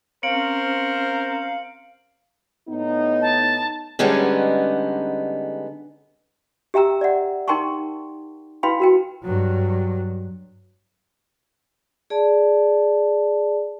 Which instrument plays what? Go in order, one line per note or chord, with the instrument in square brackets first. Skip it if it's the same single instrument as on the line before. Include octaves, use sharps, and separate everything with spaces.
[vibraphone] C4 C#4 [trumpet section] A#4 C5 [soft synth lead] F5 [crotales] C#7 D7 F#7
[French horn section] A2 B3 D#4
[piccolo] A5
[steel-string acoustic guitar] D3 G3 G#3 B3 C#4 D#4
[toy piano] G4 E5 G5 A#5 E6
D5 E5 F#5
D#4 A#4 G5 A5 C6 C#6
E4 B4 F5 G5 B5 C6
F#4 A#4 G5
[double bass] G2 F#3
[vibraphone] G#4 D5 A5